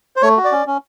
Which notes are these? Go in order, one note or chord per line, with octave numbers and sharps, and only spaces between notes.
C5
A3 C#5
F#4
D5
C#4
C#4